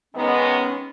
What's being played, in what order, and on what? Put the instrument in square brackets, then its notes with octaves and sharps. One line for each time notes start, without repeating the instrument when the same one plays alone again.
[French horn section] D#3 G#3 B3 D#4 [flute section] C#4